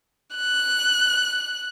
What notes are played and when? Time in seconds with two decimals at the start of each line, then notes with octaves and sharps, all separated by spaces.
0.35 F#6